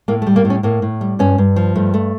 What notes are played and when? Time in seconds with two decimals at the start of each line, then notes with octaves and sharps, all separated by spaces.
0.08 A2 A#3
0.22 A3
0.27 G3
0.36 A#3
0.45 A2
0.50 C#4
0.63 A2 A#3
0.82 A2
1.01 G3
1.19 G2 C#4
1.38 G2
1.56 F3
1.76 G2 A3
1.94 A3